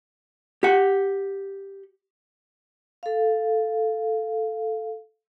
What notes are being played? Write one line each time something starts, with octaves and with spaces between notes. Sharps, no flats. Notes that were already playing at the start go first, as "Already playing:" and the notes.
G4 F#5
A4 F5